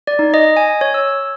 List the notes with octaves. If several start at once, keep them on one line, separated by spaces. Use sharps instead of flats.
D5
D#4
D#5
G#5
C#5
E6